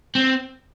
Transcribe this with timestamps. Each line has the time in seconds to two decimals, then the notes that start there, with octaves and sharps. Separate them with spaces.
0.15 C4